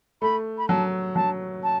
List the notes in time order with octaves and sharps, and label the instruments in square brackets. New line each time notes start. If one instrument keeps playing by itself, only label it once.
[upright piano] A3 [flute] B5
[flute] B5
[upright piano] F#3 [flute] A5
[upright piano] F#3 [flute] A5
[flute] A5